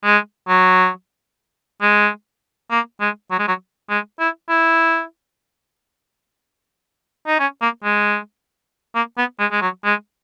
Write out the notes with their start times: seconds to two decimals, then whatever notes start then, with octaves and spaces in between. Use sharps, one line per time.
0.04 G#3
0.49 F#3
1.82 G#3
2.71 A#3
3.01 G#3
3.31 F#3
3.39 G#3
3.48 F#3
3.90 G#3
4.20 E4
4.49 E4
7.27 D#4
7.40 C#4
7.61 A#3
7.84 G#3
8.95 A#3
9.18 B3
9.39 G#3
9.51 G#3
9.62 F#3
9.85 G#3